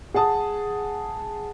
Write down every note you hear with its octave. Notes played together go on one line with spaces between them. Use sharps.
G#4 F#5 A5 D#6